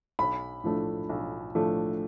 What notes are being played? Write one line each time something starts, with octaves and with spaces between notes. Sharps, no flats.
B1 B5
A2 F3 A3 D4
B1
A2 F3 A3 D4